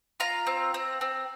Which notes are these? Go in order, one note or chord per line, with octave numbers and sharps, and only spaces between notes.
F4 A#5
C4
C4
C4